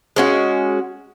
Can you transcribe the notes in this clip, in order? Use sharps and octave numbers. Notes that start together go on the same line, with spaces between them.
G#3 C#4 F#4